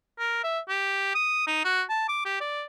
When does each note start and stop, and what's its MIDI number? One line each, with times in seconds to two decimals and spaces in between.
0.19 0.39 70
0.44 0.60 76
0.69 1.10 67
1.15 1.43 87
1.47 1.64 63
1.64 1.82 66
1.89 2.04 81
2.08 2.24 86
2.25 2.41 67
2.41 2.63 74